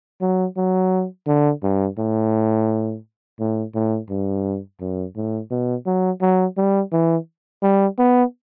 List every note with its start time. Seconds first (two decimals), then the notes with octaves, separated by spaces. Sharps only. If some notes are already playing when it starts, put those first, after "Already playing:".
0.21 F#3
0.57 F#3
1.27 D3
1.63 G2
1.98 A2
3.39 A2
3.74 A2
4.10 G2
4.81 F#2
5.16 A2
5.51 B2
5.86 F#3
6.21 F#3
6.57 G3
6.92 E3
7.62 G3
7.99 B3